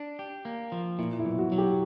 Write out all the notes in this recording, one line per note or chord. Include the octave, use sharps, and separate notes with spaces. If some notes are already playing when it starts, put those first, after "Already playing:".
Already playing: D4
G4
A#3
F3
A#2 E4
E4
B1
F#4
F#3
G4